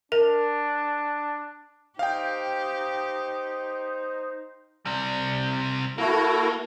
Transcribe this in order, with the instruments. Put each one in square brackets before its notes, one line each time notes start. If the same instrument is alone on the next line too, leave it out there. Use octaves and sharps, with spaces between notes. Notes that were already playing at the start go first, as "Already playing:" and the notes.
[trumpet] D4 [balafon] A#4
[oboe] D#4 [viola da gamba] G4 [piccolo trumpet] C5 [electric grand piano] F5 G5
[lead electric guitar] C3 G3
[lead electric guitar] A#3 [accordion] E4 F#4 A4